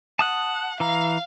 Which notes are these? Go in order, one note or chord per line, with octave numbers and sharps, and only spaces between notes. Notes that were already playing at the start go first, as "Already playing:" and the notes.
F#5 A5 D#6 F#6
E3 F5 A#5